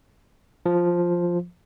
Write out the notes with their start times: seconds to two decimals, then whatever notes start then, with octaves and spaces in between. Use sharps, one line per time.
0.66 F3